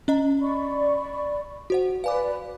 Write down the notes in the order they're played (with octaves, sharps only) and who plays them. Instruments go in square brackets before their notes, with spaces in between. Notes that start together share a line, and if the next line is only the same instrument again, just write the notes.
[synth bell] C#4 D#5 A#5
[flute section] D5 B5 C#6
[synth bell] F#4 C5 F#5
[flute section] B4 D5 [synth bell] F5 G#5 D6